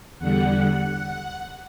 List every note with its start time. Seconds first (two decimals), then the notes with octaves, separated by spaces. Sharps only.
0.19 E2 D3 G3 F#5